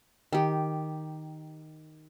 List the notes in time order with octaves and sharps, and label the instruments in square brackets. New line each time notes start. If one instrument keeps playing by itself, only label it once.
[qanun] D#3 G4